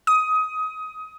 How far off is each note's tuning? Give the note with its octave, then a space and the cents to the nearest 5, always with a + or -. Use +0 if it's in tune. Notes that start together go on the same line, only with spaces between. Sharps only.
D#6 +20